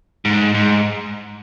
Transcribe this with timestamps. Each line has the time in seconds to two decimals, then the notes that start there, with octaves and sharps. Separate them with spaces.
0.25 G#2
0.54 G#2